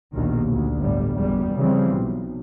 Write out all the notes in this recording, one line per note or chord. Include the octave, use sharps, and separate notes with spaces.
A#1 D#2 B2 D#3
D2
G1 A2 G3
F#1 E2 G3
C#3 E3 F3 G3 C4
B1